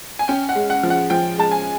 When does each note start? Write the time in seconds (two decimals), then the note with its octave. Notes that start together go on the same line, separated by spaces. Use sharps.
0.19 G#5
0.28 C#4 G5
0.49 F#5
0.55 G#3
0.70 F#5
0.83 F3
0.90 F#5
1.10 F3 G5
1.38 G#3 A5
1.51 G#5